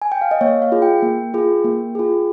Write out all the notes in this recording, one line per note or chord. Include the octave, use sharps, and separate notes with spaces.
G#5
G5
F5
D#5
A#3 C#5
F5
F4 G#4
G5
A#3
F4 G#4
A#3
F4 G#4